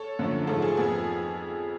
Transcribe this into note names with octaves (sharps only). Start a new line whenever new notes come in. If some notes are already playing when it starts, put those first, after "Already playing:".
Already playing: A4 C#5
F#2 D3 F3 A3
G#2 F3 A3 A4
G#4
F2 F3 B3 G#4